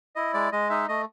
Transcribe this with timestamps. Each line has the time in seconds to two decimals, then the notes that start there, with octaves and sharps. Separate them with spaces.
0.16 E4 D#5
0.34 G#3 D5
0.52 G#3 D#5
0.70 D#4 E5
0.88 A3 D#5